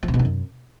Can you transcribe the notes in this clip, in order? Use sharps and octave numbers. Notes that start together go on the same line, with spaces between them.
F3
C3
B2
D#3
F#2